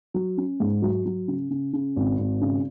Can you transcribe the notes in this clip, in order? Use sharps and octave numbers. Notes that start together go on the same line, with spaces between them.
F#3
C#4
G#2
F#3
F#3
C#3
C#3
C#3
G#1
G#1
C#3